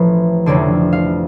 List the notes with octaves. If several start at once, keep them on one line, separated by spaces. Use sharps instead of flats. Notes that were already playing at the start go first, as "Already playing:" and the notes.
Already playing: A1 A2 F3 B4
F1 F2 D3 D5
F5